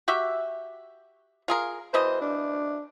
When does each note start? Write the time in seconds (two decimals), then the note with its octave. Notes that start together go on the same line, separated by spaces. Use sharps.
0.08 F#4 G4 E5
1.48 F4 G#4 A#4
1.94 B2 E3 C5 D#5
2.21 D4